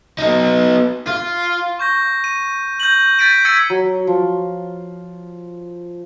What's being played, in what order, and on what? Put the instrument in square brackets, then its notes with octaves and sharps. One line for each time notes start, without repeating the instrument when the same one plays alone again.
[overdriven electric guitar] B3 D#4
F4
[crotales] C#6 G6 A#6
D#7
G6 A#6 F#7
G6 A6 B6 D7 D#7
E6 G#6 A6 B6 C#7 D#7
[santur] F#3
F3